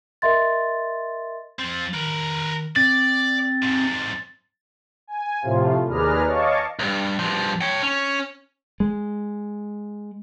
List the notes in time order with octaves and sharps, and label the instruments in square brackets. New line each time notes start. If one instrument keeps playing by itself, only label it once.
[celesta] A#4 D#5 E5 C6 A6
[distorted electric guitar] F3 C4 [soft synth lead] A6
[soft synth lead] D#3 [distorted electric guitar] A#4 B4
[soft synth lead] C4 [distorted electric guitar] D5 [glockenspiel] A6
[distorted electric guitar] G#2 C3
[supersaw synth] G#5
A2 C3 F3 F4
D#2 G#4 B4 D5 A#5 F6
C#5 D#5 F5 A5 C#6 D6
[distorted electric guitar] C#2 G2
G2 F3
C#5 G5
C#4
[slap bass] G#3